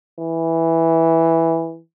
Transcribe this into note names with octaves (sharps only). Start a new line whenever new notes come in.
E3